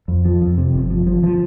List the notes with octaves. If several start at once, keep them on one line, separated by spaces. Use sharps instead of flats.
F2
F3
F2
C3
G1
F3
F3
F3